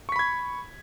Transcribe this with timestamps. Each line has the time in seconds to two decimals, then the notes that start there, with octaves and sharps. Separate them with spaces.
0.09 C#6
0.12 B6
0.16 B5
0.19 G#6